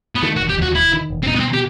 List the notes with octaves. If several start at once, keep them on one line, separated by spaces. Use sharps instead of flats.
B3
D#3 A3
F#4
E1
G4
D#2 F#4
E1 E4
D#3
E1
C4
B2 D#4
B3
C4
G4